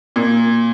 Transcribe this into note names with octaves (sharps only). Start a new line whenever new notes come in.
A#2